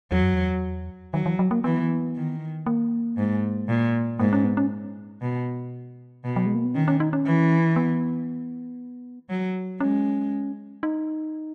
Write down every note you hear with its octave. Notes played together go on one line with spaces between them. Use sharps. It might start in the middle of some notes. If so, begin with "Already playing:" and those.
E2 F#3
F#2
E2
D#3 F#3
E3
F#3
A#3
E3 B3
D#3
A#3
G#2
A#2
G#2 A#3
C#4
B3
C#4
B2
B2
F#3
G#3
A#3
B3
D#3 C#4
C#4
D#4
C#4
E3
B3
F#3
G#3 C#4
D#4